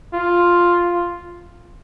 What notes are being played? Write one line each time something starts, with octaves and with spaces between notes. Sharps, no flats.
F4